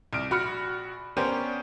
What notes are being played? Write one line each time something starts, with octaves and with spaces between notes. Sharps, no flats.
C2 F6 D7
A#1 F#4 B5 F6 C#7
B3 C#4 D4 G4 A#4 C5